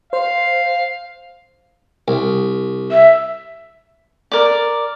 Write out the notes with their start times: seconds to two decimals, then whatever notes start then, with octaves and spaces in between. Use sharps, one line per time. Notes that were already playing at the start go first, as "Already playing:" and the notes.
0.13 C5 F5
2.08 C2
2.91 E5
4.32 A#4 D5